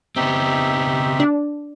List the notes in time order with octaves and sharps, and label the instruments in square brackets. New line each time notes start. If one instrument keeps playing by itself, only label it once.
[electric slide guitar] C#3 B3 C4 [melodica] D#4 G4 E5
[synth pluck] D4